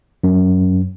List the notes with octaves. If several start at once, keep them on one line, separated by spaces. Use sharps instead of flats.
F#2